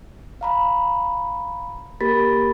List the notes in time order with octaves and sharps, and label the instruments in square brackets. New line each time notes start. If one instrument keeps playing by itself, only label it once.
[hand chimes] F5 A#5 B5
A#3 G4 A#4 B5 A6 B6